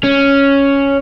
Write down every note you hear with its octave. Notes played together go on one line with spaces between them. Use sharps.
C#4